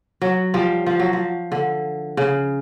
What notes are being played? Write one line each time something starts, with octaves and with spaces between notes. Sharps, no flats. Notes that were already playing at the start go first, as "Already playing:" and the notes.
F#3
F3 G3
F3
F#3
F3
D3
C#3